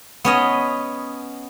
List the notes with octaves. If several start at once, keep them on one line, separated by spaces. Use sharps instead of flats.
B3 C#4 D#5